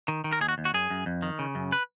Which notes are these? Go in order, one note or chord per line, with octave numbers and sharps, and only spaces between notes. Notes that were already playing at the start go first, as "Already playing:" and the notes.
D#3
D#3
A#4
D#2 G#4
F#4
D#2
F#4
F#2 G#4
F#2
F2
D#3
C#3
F#2
B4